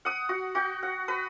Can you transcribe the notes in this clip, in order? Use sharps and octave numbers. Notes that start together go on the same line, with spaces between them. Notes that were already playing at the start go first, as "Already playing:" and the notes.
F#5 D#6
F#4
F#4 G5
F#5
B4